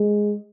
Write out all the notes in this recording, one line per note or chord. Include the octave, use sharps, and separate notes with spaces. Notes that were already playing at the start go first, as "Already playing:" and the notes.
Already playing: G#3